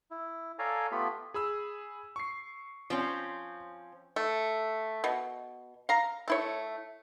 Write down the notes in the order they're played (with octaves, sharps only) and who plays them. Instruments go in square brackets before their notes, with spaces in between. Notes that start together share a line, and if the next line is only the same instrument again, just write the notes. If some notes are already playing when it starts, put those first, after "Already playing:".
[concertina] E4
A4 C#5 D5 F5 G#5 A#5
A3 B3 F4 G4 B5
[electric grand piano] G#4 B5 E6
C#6 C7
[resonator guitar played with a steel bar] F3 C4 C#4
[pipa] A3
B2
F5 A#5
A3 E4 C#5